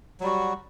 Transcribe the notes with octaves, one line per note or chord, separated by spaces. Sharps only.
F#3 G3 F#4